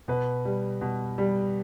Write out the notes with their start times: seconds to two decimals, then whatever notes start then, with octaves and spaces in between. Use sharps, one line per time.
0.08 B2 B4
0.45 G3
0.81 B2
1.18 G3